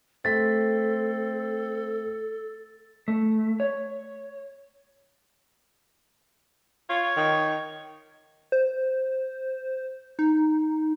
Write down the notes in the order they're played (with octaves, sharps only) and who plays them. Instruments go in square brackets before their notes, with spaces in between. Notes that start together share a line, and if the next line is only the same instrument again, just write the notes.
[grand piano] A3 B6 [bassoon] C4 [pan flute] A4 [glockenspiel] A6
[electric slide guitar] A3
C#5
[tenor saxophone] F4 [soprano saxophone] C#5
[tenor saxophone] D#3
[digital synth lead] C5
D#4